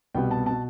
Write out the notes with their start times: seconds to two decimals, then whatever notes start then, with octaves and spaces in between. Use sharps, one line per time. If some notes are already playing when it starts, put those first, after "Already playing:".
0.15 C2 B2 G3 B3 G5
0.31 A5
0.46 B2 A5